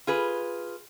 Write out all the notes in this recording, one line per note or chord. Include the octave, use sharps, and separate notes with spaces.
F4 G#4 B4